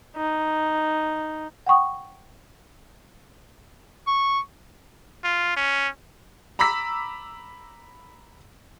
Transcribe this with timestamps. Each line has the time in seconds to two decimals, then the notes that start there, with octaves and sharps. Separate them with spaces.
0.17 D#4
1.66 F#5 G5 C#6 D#6
4.07 C#6
5.24 F4
5.57 C#4
6.59 A#5 B5 D6 E6 B6